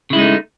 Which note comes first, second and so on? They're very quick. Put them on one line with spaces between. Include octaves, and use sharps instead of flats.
C#3 E4 G#3 D#4 A3